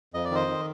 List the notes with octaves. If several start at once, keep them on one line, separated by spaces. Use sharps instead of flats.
F2 D#5
D5
D#3 C5 D#5
D#3